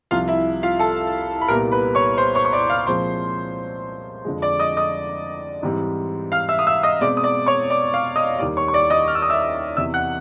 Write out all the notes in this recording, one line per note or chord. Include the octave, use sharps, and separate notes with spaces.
C2 C3 F3 F4 F5
E4 E5
F4 F5
A4 A5
B5
C2 A#2 G3 B3 A#4 A#5
B4 B5
C#5 C#6
C5 C6
C#5 C#6
C#6
D5 D6
F5 F6
A#2 F3 G#3 C4 C5 C6
F2 D3 F3 G#3
D5 D6
D#5 D#6
D#5 D#6
G#2 E3 G3 C4
F5 F6
E5 E6
D#6
E5 E6
D#5 D#6
B2 G#3 C4 D5 D6
D#6
D5 D6
C#5 C#6
D5 D6
F5 F6
D#5 D#6
D#2 D#3 G3 D5 D6
C#5 C#6
C#6
D5 D6
D#5 D#6
F6
E6
D#6
E5 E6
E2 C3 E3 E5 E6
F#5 F#6